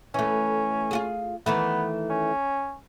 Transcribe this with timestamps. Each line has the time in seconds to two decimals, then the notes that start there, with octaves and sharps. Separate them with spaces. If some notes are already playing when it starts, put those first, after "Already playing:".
0.14 E3 A3 C#4
0.91 F4 F#4 G#4
1.46 D#3 E3 A3 B3
2.10 C#4